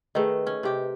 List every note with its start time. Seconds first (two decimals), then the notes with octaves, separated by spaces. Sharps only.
0.15 D#3 A3 G#4 B4 D#5
0.47 C#4
0.63 C3 G4